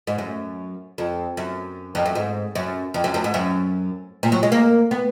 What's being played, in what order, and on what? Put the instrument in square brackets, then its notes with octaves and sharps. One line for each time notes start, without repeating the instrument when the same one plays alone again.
[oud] G#2
F#2
F2
F#2
F2
F#2
G#2
F#2
F2
F#2
F#2
G#2
F#2
A#2
F#3
G#3
A#3
B3